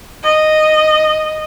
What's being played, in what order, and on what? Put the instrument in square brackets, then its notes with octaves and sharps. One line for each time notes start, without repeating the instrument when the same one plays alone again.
[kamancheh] D#5